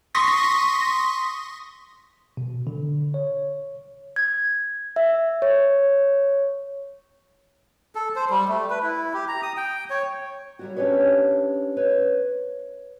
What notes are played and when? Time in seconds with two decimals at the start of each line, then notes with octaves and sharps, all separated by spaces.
0.15 C6 C#6 D#6 A#6 B6
2.37 B2
2.67 D3
3.14 C#5
4.16 G#6
4.96 E5
5.42 C#5
7.95 A4
8.16 C5
8.30 G3
8.48 A3
8.70 B4
8.83 E4
9.14 G4
9.28 A#5
9.42 D#6
9.57 G5
9.90 C#5
10.59 F#3 G3 F#4
10.77 C#4 D4 G4 B4 C#5
11.77 B4 C#5